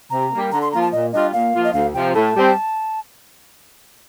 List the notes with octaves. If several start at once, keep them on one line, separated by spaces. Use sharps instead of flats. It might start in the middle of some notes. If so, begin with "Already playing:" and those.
C3 A#5
G3 A#3
D3 A#5
C6
F3 A#3 F4 A#5
A5
A#2 D#5
G3 D4 F4 D#5
A#2 F5
F3 A#3 F4
D#5
D2 F5
C3 F3 G5
A2 A5
G3 C4